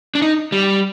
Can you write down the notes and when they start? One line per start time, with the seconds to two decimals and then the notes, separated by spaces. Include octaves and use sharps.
0.15 D4
0.22 D#4
0.52 G3